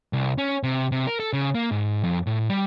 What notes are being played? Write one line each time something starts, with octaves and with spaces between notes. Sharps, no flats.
C2
C#4
C3
C3
A#4
A4
C#3
A#3
G#2
F2
A2
G3